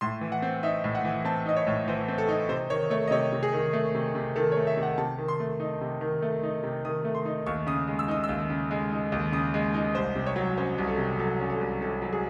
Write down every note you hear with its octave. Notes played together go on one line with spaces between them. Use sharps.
A2 C6
E3
F#5
C4
D#4 E5
A2
F#5
E3
C4 A5
D#4 D#5
C#5
A2
E3 C5
C4
A4
D#4
C3 C5
D#3 C#5
A3 C#5
D#5
C3 C#5
C3
G#4
D#3
A3
C3
C3
D#3 A4
C#5
A3
E5
C3
F#5
C3 A5
D#3
C6
A3
D#4
C3
D#3
A3
D#4
C3
D#3 D#6
A3
C6
D#4
D#2 C#6
C#3 D#6
G#3
E6
D#4 D#6
E6
D#2
C#3
G#3
D#4
D#2
C#3 D#6
G#3
D#4
C2 C5
C3
C#5
F#3
C#4 C5
C2
A4
C3
F#3 A4
C#4
A4
C2
C3 A4
F#3
G#4